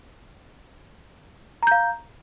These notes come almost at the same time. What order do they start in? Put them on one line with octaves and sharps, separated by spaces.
A#5 G6 F5